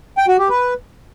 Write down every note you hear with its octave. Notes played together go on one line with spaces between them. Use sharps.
G5
F#4
G4
B4